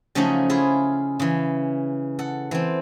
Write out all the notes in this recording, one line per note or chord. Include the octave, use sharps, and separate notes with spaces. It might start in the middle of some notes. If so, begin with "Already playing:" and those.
C#3 F3 F#3 A3 C#4 D#4
E4 F4 G#4
C#3 E3
A4 F#5
E3 C4